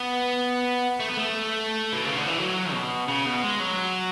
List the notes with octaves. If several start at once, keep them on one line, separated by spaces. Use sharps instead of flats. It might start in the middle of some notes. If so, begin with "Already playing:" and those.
Already playing: B3
A3
B3
A3
B2
C#3
D3
E3
F#3
B2
C#3
B2
G#3
F#3